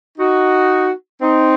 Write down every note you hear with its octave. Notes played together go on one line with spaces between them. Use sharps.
D#4 F#4
C4 D#4